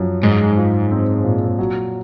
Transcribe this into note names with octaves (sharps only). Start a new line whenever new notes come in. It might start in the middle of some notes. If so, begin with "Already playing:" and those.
Already playing: F#2 F3
G#2 G#3
F4
C4
A#2
F#3